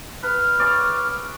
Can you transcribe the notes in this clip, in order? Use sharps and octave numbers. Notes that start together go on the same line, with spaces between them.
B4 F6
G#4 C#5 D5